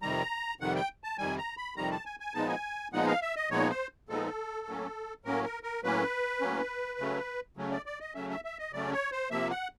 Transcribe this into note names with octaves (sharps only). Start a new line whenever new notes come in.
F2 C3 D#3 G3 A#5
F2 C3 D#3 G3 F#5
G5
A5
F2 C3 D#3 G3 G#5
A#5
B5
F2 C3 D#3 G3 A#5
A5
G#5
G#5
A#2 F3 G#3 B3 D#4 A5
G#5
A#2 F3 G#3 B3 D#4 F#5
F5
E5
D#5
A#2 F3 G#3 B3 D#4 C#5
C5
A#2 F3 G#3 B3 D#4 A4
A2 F#3 A#3 C#4
A2 F#3 A#3 C#4 A#4
A#4
A#4
A2 F#3 A#3 C#4 B4
A2 F#3 A#3 C#4
C#3 F#3 A3 C#4
C#3 F#3 A3 C#4
D5
D5
D#5
C#3 F#3 A3 C#4 E5
E5
E5
D#5
C#3 F#3 A3 C#4 D5
C#5
C5
C3 F3 A#3 E5
F#5